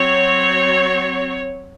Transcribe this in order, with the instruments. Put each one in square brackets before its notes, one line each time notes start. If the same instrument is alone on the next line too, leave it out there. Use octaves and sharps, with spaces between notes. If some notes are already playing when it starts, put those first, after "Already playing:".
Already playing: [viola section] F#3 C4 C#5